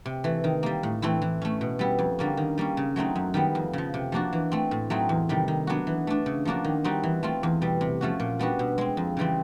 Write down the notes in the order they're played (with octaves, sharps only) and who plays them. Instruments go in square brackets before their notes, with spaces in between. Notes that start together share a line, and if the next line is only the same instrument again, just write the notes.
[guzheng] C3
E3 A3
D#3
G3 A#3
A2
E3 A3 C4 E4
E3
A3 C#4
B2
G3 B3 E4
F2
D3 G3 A#3 C#4
D#3
G3 A#3 C#4
C#3
F#3 A3 C4 D#4
F#2
D#3 G3 B3
F2
C#3 F3
C3
F3 A#3 D4 F#4
E3
A3 C4
A2
F#3 A3 C4 D#4
E2
C3 D#3 G3
D#3
F#3 B3 D4 F#4
E3
A3 D4
C#3
F3 A#3 D4 F#4
D#3
G3 C4 D#4 F#4
E3
A3 C4 F4
E2
B2 G3
C3
F3 A3 C#4 F#4
A#2
G3 B3 D4 F#4
B2
G#3 C4
F2
C#3 E3 G3 C4